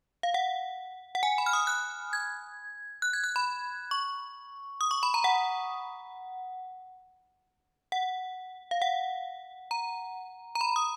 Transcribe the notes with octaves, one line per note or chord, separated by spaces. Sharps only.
F5
F#5
F#5
G#5
B5
F6
D#6
F#6
G#6
F#6
G#6
F#6
B5
C#6
D#6
C#6
B5
A#5
F#5
F#5
F5
F#5
A#5
A#5
B5
D#6